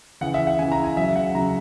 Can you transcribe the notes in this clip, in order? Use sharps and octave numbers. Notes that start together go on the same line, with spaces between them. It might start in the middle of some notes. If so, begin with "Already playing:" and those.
C#3 E3 F#5
E5
F#5
C#3 E3 G#5
A#5
G#5
C#3 F#3 E5
F#5
C#3 F#3 A#5